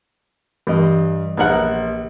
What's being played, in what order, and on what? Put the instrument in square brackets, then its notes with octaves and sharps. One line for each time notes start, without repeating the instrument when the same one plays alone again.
[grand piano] G2 [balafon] E3 [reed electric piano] G4 D#5
[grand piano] A#1 F#7 [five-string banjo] B3 A#4 F#5